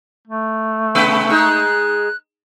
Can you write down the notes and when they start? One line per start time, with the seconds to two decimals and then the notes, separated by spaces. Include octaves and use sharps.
0.27 A3
0.95 C3 B3 B4
1.30 G#3 D#4 F#6